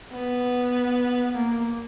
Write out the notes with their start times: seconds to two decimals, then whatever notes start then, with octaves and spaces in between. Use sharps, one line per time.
0.12 B3
1.35 A#3